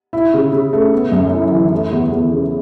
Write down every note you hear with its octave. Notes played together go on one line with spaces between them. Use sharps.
E4
C#3
C#3
A3
B3
F#2
E4
E3
A3
E2
E2
C#3